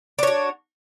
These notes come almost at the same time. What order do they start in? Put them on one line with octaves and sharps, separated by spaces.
D4 C#5 F#4